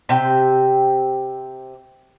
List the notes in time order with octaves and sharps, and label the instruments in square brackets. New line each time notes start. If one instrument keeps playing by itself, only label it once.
[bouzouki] C3 G5